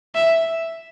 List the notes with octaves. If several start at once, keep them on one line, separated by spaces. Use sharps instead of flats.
E5